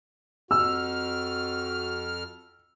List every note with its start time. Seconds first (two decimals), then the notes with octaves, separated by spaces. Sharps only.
0.51 F2 F#4 E6 F6